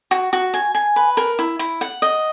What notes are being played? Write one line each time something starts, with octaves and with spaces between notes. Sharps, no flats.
F#4
F#4
G#5
G#5
B4
A#4
E4
E4
F#5
D#5